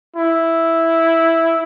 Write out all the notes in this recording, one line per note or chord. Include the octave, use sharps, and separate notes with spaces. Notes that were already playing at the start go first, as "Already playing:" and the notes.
E4